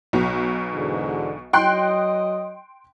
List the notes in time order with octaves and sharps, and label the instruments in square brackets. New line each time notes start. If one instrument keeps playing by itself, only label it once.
[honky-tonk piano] B1 B2
[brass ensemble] E2 G#2 D3
[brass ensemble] F#3 D#5 [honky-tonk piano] G5 C6 F#6